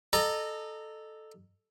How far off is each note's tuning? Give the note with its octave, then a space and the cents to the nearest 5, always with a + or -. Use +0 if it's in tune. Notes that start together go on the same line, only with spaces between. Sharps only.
A4 -5 D#5 -30 A#5 -15